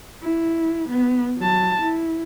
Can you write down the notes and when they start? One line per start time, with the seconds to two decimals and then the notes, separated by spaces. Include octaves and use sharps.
0.22 E4
0.89 B3
1.37 F#3 A5
1.81 E4